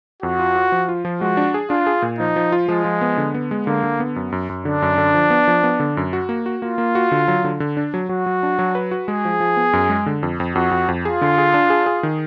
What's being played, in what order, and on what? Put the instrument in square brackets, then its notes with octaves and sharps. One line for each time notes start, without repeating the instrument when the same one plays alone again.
[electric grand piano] F2 [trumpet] F#4
[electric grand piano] F4
F4
F3
F4
F3
[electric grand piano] G#3 [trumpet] F#4
[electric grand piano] D4
G#4
[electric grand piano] D4 [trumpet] F4
[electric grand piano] G#4
A#2
[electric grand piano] F3 [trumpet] D#4
[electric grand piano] F3
F4
[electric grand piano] F3 [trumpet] G#3
[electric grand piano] F3
B3
D3
B3
G#3
[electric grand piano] D3 [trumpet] A#3
[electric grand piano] D3
B3
F#2
F#2
F#2
[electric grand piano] D3 [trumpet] D4
[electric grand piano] F#2
D3
F3
B3
F3
B3
D3
F#2
F#4
A#3
F#4
[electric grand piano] A#3 [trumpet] F4
[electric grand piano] A#3
F#4
D3
F#3
D3
D3
D4
F#3
[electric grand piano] F#3 [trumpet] F#4
[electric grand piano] F#3
D4
F#3
B4
F#4
[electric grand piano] G#3 [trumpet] G#4
[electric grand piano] F3
F3
B3
F#2
G#3
D3
F2
F2
[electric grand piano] F2 [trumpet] F#4
[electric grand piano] F2
F2
[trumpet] F4 [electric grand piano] G#4
[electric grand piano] D3
G#4
D4
G#4
G#4
D#3